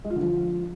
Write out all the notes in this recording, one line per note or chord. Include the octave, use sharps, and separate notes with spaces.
G#3
F4
D3
F3